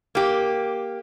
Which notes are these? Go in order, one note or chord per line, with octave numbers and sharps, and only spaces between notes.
A#3 G4